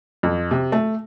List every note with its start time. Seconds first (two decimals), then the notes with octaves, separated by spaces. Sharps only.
0.23 F2
0.51 C3
0.72 A3